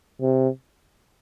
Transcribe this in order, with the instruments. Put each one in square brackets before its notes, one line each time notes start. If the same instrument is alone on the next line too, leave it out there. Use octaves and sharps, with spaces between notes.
[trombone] C3